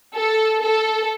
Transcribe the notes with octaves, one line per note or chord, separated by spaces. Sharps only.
A4
A4